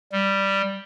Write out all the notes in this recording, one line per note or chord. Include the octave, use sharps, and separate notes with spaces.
G3